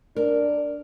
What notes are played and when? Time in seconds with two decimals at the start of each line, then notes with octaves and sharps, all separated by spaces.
0.16 D4 A#4